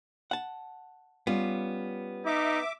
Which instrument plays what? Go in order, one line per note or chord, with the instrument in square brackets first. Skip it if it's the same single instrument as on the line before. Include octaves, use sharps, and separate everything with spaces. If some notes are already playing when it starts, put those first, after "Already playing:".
[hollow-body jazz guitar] F#5 A5
[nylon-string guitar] G3 C#4 F4 [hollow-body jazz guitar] B3
[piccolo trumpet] D#4 [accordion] E5 D6